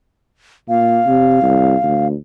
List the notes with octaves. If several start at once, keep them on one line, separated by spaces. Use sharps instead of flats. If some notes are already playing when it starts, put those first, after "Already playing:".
A#2 F5
C3
C2
D2